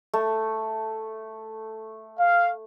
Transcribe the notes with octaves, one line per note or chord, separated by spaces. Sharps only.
A3
F5